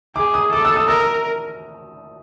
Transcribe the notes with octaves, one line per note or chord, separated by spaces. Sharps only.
G#4 D6
D#6
A4 D6
E6
D#6
A#4 E6
E6